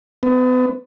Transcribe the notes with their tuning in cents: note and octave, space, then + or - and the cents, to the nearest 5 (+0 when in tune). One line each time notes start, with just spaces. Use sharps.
B3 +40